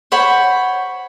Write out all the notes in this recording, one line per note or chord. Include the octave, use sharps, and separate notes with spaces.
C5 C#5 F#5 B5